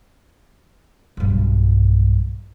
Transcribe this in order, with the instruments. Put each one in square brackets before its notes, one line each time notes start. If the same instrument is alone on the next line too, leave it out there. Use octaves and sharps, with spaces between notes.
[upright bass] B1 G2